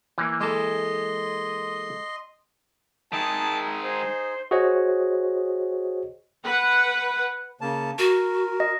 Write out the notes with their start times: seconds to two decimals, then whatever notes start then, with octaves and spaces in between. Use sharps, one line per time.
0.18 E3 A#3
0.41 G#3 A4 D#5 C6
3.12 D#3 G#3 D#4 G#4 E5 A5
3.84 D#4 G#4 C5
4.51 F#4 G#4 C5 C#5 D#5
6.43 B4 F#5
7.61 C#3 A#3 A5
7.99 F#4 A#4
8.60 D#5